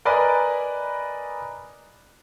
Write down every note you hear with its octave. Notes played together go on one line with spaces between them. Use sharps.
A#4 B4 D5 D#5 G#5 B5